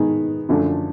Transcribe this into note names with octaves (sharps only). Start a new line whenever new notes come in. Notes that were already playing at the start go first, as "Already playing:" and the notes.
Already playing: G#2 D#3 G#3 B3 D#4
F#2 D3 F3 A3 D4